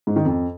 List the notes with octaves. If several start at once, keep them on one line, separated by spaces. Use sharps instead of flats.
G#2
D#3
F2